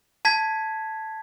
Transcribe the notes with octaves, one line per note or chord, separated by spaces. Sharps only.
A5 G#6 B6